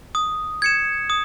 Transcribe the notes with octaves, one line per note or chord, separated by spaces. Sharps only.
D#6
G#6 C#7 E7
D#6